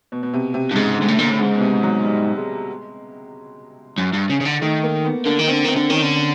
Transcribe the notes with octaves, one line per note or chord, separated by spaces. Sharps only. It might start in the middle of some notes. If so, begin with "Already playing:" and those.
B2
B2
C3
C3
G2
G#2 C#3
G#2 D3
A2
A#2 D3
A2
G#2 C#3
B2
C3
F#3
G3
G#3
F#2
G2
C#3
C#3
D3
D#3 A3
A#3
B3
D3 A#3
D#3
D3 C4
D#3 C4
D3
D#3 C#4
D3